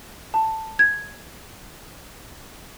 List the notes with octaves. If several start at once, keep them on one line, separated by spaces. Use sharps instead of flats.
A5
G#6